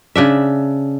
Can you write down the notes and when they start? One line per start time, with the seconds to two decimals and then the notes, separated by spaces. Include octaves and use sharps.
0.16 C#3 D4 E5